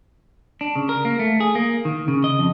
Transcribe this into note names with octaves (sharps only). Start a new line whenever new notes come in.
D4
C#3
A#4
A#3
A3
G#4
A#3
D#3
C#3
D#5
F2